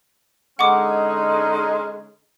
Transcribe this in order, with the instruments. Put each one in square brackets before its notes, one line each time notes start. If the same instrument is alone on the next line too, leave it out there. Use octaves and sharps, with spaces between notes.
[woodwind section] D3 C#4 D#4 [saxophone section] G#3 [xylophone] F#5 C#6 D6